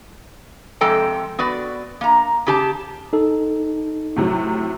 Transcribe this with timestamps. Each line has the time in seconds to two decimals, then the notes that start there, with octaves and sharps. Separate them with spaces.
0.81 F2 C3 G#3 A4 G5 A#5
1.39 B3 F#4 B4 D5
2.01 A#3 A#5
2.47 C#3 G4 A5
3.13 D#4 A4
4.16 A2 C3 F#3